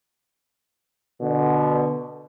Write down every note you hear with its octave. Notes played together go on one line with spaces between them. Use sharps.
B2 D3